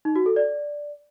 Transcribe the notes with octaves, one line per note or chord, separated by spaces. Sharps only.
D#4
F#4
A4
D5